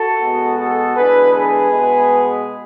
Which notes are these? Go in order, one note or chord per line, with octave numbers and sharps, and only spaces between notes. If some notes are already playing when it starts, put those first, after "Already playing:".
Already playing: F#4 A4
B2 G#3 B3
F#4 A4
E2 D3 G#3 G#4 B4
G#4 B4
B2 G#3 B3